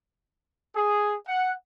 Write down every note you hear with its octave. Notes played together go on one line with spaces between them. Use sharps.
G#4
F#5